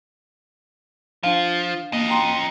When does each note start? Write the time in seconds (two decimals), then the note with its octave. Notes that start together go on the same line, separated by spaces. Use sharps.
1.23 F3 D4 F5
1.92 F2 A#3 D#5
2.08 G5 A#5 C6